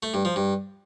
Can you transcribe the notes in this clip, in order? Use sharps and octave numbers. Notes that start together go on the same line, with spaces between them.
A3
G2
F3
G2